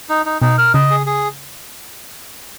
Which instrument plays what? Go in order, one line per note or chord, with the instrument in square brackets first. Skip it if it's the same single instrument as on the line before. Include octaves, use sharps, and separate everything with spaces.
[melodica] D#4
D#4
[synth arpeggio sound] B2 [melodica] D#4
[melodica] A#4
[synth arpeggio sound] C#3 [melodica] D#5
[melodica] G#4
G#4